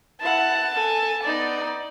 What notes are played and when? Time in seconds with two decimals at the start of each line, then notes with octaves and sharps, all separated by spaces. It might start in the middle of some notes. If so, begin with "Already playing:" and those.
0.21 E4 F#5 A5
0.74 A4 G#5
1.23 B3 D#4 D5